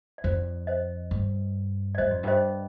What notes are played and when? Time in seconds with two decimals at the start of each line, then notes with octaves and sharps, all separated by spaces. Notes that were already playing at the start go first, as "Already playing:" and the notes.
0.18 D5
0.24 F2 C5
0.67 C5 D#5
1.11 G2
1.95 D5
1.98 G2 C5 D#5
2.10 F2
2.23 G2 C5 D#5